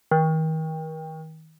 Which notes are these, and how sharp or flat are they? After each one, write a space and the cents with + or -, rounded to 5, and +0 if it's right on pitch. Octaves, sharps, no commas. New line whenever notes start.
D#3 +35